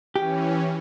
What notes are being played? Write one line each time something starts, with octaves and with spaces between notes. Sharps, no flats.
E3 C#4 G4